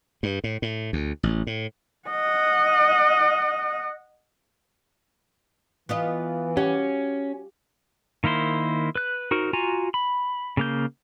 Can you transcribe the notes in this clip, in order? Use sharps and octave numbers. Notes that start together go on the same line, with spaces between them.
G2
A2
A2
D2
A1
A2
D#5 F#5
E3 B3 F4 D#5
C#4 F#4 G4
D#3 A#3 E4 C5
B4 F#6
D#4 F#4 A#4 C5
F4 F#4 G#5 A#5
B5
C#3 A#3 G6